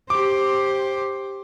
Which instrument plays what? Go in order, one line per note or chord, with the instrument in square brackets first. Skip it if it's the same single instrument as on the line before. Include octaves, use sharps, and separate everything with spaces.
[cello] G4 C5 [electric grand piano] D6